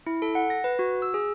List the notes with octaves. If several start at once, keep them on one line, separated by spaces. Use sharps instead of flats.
E4
A4
F#5
A#6
B4
F#4
E6
G#4